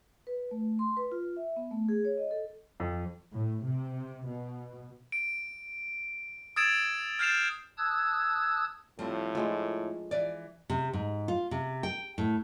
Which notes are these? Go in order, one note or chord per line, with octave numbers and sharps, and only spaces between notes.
B4
A3
C6
B4
F4
E5
B3
A3
G#4
C#5
D#5
A4
F2
A2
C3
B2
D7
D#6 E6 G#6 A6 D7 E7
F6 G6 A6 C7 E7 F7
A5 D#6 E6 F#6 G#6
A2 F3 G3 C4
F3 G#3 A3 D4
E3 D5
C3
G#2
F4
C3
G5
A2